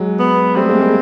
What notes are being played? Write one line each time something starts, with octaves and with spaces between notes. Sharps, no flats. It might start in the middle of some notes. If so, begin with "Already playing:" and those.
Already playing: F#3 G#3
B3
G3 A3 C4
G#3 A#3
G#3 A#3